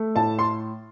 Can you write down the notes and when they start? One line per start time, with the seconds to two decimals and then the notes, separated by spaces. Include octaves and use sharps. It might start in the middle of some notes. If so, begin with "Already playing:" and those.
Already playing: A3
0.16 A2 A5
0.39 C6